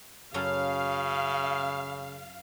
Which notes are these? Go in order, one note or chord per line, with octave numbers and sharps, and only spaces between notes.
F#2 C#3 C#4 A4 F5